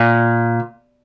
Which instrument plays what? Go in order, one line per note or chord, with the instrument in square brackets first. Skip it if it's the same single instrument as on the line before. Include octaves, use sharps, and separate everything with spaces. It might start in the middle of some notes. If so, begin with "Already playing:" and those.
Already playing: [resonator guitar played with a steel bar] A#2